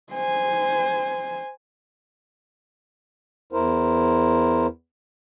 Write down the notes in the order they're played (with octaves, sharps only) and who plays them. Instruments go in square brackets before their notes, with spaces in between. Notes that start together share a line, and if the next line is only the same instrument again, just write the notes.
[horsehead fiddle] C5 G#5
[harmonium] E2 E4 A#4 C5